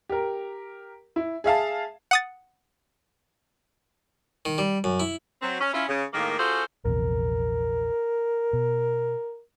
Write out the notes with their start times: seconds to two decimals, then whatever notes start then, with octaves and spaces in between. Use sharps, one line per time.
0.09 G4 A#4
1.16 E4
1.44 G#4 E5 F5 A5
2.11 F#5 D#6 A6
4.45 D#3
4.58 G3
4.84 F#2
5.00 E4
5.42 F#3 C4
5.61 C#4
5.74 C#4 E4 F4
5.89 C#3
6.13 A2 D#3 G#3 A#3
6.39 C#4 F4 F#4 G#4 A4 C5
6.85 A#1 E2 C3 A#4
8.53 B2